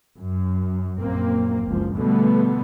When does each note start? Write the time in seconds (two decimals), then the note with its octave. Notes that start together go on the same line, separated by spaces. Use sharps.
0.17 F#2
0.99 A#1 F#2 A#3 C4
1.65 F#1 C#2 F3
1.96 B2 D3 G3 A3 B3